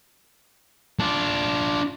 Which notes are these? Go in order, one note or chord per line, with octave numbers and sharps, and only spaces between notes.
D4 F4